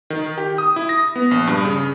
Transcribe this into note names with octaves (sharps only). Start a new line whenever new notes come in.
D#3
G4
D#6
E4
A#6
B3
A#1
G2
C#3